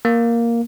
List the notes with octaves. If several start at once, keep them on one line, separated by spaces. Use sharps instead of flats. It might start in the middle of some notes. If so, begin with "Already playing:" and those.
A#3